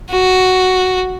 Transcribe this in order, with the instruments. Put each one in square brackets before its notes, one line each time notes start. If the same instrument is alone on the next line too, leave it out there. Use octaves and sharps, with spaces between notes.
[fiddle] F#4